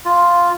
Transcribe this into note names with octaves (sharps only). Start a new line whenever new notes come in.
F4